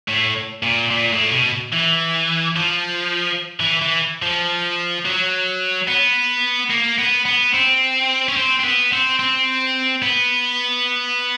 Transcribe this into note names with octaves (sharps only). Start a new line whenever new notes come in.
A2
A#2
A#2
A2
B2
E3
F3
E3
E3
F3
F#3
B3
A#3
B3
B3
C4
C#4
C4
C4
B3
C4
C4
B3